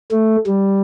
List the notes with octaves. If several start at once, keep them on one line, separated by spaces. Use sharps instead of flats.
A3
G3